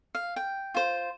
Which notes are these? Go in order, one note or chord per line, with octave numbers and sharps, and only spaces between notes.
F5
G5
F4 C5